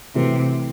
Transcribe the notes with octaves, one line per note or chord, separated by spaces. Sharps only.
C3 E3 A3 C4 F#4 B4